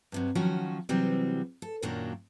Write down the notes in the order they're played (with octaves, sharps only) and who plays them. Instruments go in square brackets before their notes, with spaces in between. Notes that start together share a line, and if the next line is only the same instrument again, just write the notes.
[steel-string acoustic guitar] G2 C3 F#3
D#3 F3 F#3 C#4 F#4
C3 E3 F#3 G3 C4
A4
F#2 A#2 D#3 F#3 A#3 D4